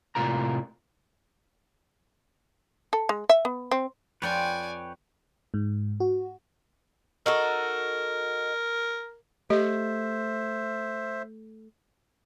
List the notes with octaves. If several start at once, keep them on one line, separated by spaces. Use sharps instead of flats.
A2 C3 F4 A#4 A#5
A4
G#3
E5
B3
C4
F2 C4 F4 B4 C#5 D5 G5 G#5
G#2
F#4
D#4 F#4 A4 A#4
A3 G4 C5 D#5 E5